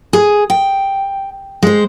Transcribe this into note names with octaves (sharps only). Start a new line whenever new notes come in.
G#4
G5
G#3 C5